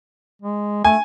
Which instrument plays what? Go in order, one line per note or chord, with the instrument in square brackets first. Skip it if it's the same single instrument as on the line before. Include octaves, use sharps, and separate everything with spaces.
[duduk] G#3
[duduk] A3 [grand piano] G#5